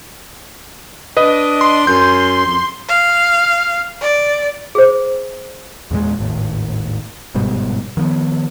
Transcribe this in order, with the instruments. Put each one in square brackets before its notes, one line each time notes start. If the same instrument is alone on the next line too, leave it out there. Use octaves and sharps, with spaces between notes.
[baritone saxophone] D4 [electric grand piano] B4 D#5 D#6
[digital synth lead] C6
[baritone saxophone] F#2 [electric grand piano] G6
[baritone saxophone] F2
[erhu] F5
D5
[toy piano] G#4 C5
[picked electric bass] E2 A#2 G#3
G#1 D#2 A2
G1 G#2 B2 G3
D#3 F3 A#3 B3